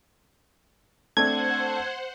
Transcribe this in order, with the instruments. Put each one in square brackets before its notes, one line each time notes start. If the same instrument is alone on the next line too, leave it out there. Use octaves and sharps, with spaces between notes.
[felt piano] A3 C4 D4 [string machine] C5 F#5 [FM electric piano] G#6